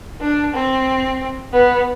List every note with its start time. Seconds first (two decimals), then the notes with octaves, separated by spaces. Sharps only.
0.21 D4
0.54 C4
1.53 B3